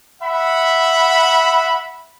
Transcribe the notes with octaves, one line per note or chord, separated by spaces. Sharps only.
E5 F#5 B5